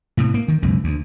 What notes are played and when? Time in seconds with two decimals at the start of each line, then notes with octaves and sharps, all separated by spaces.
0.17 A2 C3
0.34 A#3
0.48 D#3
0.62 C#2 F#2 B2
0.84 D2